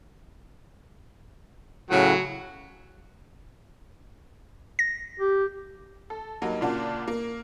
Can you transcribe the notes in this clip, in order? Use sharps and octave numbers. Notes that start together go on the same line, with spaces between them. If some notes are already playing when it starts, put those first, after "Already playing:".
A2 C#3 F#3 F#5
A#6
G4
A4
G2 F#3 A#3 D#4
A#2 C#3 A#3 D4 F4 F#4
A#3